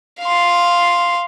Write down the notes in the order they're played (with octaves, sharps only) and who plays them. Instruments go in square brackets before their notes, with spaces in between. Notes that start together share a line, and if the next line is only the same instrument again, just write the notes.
[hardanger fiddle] F5 C6